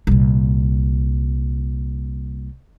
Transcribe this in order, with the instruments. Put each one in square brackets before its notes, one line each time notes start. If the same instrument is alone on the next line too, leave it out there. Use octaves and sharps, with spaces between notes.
[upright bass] C2 A#2